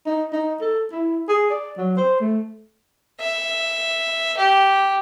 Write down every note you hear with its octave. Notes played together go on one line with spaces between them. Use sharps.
D#4
D#4
A4
E4
G#4
D5
F#3
C5
A3
E5
G4